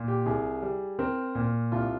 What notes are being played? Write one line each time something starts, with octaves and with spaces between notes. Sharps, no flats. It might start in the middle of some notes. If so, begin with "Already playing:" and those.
Already playing: A#2
G4
C2 G#4
G3
C4 A#4
A#2
C2 F4